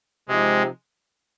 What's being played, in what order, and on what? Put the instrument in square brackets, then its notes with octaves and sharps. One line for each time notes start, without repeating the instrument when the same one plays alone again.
[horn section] C3 F3 C4 D#4 G4 [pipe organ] G#3